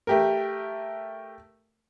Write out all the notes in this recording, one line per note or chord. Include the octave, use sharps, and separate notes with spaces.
A3 G4 A#4